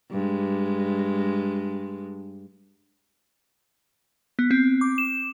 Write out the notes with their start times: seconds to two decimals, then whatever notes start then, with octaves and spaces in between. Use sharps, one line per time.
0.12 G2 G#3
4.39 B3
4.51 C4
4.81 D6
4.98 E7